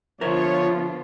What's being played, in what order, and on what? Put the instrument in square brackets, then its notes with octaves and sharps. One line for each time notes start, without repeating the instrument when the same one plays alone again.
[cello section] D3 B3 F4 [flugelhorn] F3 [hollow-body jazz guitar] A#4 C5 E5 [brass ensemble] C#5